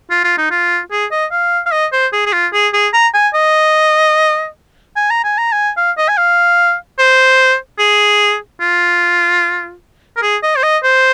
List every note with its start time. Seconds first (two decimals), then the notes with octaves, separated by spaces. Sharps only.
0.10 F4
0.24 F4
0.37 D#4
0.51 F4
0.91 G#4
1.11 D#5
1.31 F5
1.66 F5
1.72 D#5
1.92 C5
2.13 G#4
2.26 G#4
2.33 F4
2.53 G#4
2.73 G#4
2.93 A#5
3.14 G#5
3.34 D#5
4.96 G#5
5.10 A#5
5.24 G#5
5.38 A#5
5.52 G#5
5.77 F5
5.97 D#5
6.08 G#5
6.17 F5
6.99 C5
7.79 G#4
8.61 F4
10.16 A#4
10.22 G#4
10.43 D#5
10.56 C5
10.63 D#5
10.83 C5